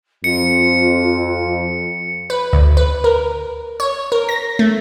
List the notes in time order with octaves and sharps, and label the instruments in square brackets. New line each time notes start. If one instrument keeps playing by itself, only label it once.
[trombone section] F2 [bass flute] F4 [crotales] C#7
[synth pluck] B4
D2
B4
A#4
C#5
A#4
A#6
A3